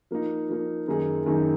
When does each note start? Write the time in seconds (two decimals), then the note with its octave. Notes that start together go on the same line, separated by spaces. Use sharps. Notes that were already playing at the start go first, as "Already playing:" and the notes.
0.11 F3 A#3 D#4
0.49 F3 A#3 D#4
0.88 F#2 D#3 A#3 D#4 G#4
1.26 F#2 D#3 A#3 D#4 G#4